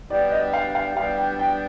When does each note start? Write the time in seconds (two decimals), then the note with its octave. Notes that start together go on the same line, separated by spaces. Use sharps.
0.10 G3 B3 D4 G4 D5
0.32 D#5
0.53 F5
0.75 F5
0.96 G3 B3 D4 G4 F5
1.18 G5
1.39 G5